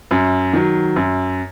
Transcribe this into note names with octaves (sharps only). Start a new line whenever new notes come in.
F#2
D#3 F#3
F#2